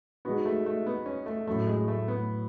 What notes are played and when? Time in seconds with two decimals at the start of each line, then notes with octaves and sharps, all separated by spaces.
0.25 G#3 B3 D#4 F#4
0.45 A3
0.66 A3
0.86 B3
1.06 C#4
1.26 A3
1.47 A2 F#3 A3 C#4
1.67 G#3
1.88 A3
2.08 B3